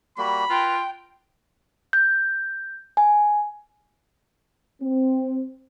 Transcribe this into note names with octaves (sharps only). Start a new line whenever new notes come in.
G3 A#3 F#4 B5
F4 B4 G5 A#5
G6
G#5
C4